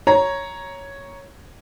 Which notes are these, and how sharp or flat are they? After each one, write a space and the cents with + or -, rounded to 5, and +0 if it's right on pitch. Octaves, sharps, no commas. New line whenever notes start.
C#5 +0 A#5 +5